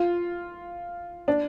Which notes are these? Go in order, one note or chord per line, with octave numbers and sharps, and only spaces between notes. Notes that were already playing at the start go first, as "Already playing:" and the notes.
Already playing: F4
D4